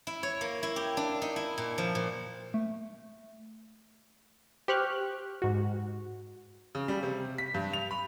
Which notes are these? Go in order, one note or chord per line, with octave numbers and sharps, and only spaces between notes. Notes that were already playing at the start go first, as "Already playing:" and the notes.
E4
C#5
A#3
E4
G4
D4
D#4
E4
A#2
F3
A#2
A3
G4 C5 C#6 F6 F#6
G#2 F#4
C#3
G3
C3
B6
G2
F7
B5